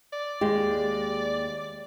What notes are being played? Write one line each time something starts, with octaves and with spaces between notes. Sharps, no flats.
D5
D#2 G#3 G4